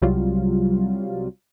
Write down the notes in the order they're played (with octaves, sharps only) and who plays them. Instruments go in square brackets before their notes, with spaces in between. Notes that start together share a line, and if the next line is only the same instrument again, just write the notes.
[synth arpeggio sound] C2 C3 F#3 G3 F4